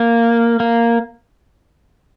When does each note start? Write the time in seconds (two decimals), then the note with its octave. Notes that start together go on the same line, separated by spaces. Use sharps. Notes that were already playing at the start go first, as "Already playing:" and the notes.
Already playing: A#3
0.60 A#3